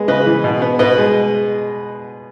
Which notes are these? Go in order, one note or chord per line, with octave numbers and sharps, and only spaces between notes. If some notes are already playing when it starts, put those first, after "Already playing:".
Already playing: G#3 B3
C#3 B4 D#5
E3
B2
B3
B2 B4 D#5
G#3